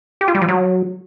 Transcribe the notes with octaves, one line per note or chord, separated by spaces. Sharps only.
G4
F4
G3
F3
F#3